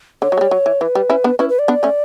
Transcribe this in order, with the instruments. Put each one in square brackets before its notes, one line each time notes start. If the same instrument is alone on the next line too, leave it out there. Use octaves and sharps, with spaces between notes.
[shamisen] D3 [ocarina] C#5
[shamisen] F#3
A3
G3
F#3
E3
[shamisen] E3 [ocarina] B4
[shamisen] G3
C#4 E4
B3 D4
[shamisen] C#4 E4 [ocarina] B4
[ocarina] B4
D5
[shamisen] B3 D4
A3 C#4